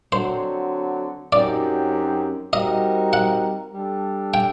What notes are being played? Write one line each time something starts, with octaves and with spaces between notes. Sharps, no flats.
D3 F#3 C4 C5
F#2 F#3 C4 D#4 G4 D5
G3 C4 D#4 F#4 A#4 D#5
F#5
G3 D4 A4
G5